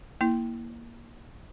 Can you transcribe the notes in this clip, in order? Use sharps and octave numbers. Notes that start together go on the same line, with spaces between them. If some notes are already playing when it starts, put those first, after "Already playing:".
A#3 E4